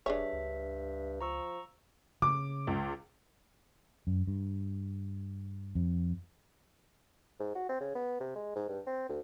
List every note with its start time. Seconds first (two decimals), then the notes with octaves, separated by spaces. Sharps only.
0.06 E1 G2 D4 G#4 C#5 E5
0.33 C#2
1.21 F3 A#5 C#6 E6
2.22 C#3 D6
2.67 C#2
4.07 F#2
4.27 G2
5.75 F2
7.40 G#2
7.55 F#4
7.69 C4
7.80 C#3
7.95 B3
8.21 C3
8.36 G#3
8.56 G#2
8.69 G2
8.87 C4
9.09 D2